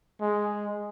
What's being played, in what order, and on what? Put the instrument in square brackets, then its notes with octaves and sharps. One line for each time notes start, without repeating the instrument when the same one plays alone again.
[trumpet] G#3